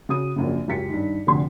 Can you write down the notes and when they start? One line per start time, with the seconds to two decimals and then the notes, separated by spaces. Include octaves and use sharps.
0.09 C#3 F#4 D#6 D#7
0.36 A#1 F#2 C#3
0.67 C#2 F#2 G4 B6 C#7
0.90 G2 D#3
1.27 F1 D2 D3 C6